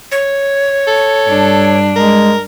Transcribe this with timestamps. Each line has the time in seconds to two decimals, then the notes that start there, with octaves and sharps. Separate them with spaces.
0.12 C#5
0.87 A4
1.27 G2 D4
1.96 G#3 A#4